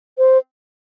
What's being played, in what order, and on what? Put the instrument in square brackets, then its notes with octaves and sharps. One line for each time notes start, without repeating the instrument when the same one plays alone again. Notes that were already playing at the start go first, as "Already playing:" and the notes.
[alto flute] C5